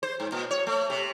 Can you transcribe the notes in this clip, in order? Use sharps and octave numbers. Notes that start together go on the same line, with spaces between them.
C5
G#2
A#2
C#5
A3
C3